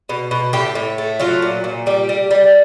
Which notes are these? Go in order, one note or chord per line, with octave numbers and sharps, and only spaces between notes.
B2
B2
A2 G4
A2
A3
F#3 F4
A#2
A#2
G3 G4
G3
G3